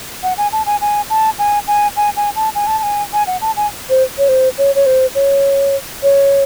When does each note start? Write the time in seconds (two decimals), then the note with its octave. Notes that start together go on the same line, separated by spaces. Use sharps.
0.23 F#5
0.38 G#5
0.52 A5
0.66 G#5
0.81 G#5
1.10 A5
1.39 G#5
1.68 G#5
1.96 G#5
2.16 G#5
2.36 A5
2.55 G#5
2.67 A5
2.78 A5
2.83 G#5
3.13 G#5
3.27 F#5
3.41 A5
3.57 G#5
3.90 C5
4.18 C#5
4.29 C5
4.58 C#5
4.75 C#5
4.86 C5
5.15 C#5
6.03 C#5